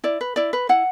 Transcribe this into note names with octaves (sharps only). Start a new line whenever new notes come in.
E4 D5
B4
E4 D5
B4
E4 F#5